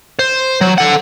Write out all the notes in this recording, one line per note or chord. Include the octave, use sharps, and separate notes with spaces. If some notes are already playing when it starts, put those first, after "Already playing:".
C5
F#3
A4 F#5